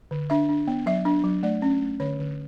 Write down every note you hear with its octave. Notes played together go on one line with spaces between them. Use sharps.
D3
D4 E5
D4
B3
F#3 E5
D4
F#3
A3 D5
C#4
A3
D3 C#5
D3